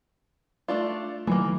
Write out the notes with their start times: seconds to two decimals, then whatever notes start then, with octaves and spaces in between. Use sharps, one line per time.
0.68 A3 D4 F4
1.27 D#3 E3 F#3 A3 A#3